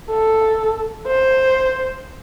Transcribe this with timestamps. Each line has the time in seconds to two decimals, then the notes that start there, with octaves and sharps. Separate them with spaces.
0.10 A4
1.07 C5